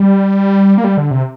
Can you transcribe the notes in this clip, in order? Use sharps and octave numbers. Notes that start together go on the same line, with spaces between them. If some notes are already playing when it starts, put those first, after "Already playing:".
Already playing: G3
A#3
G3
D3
C3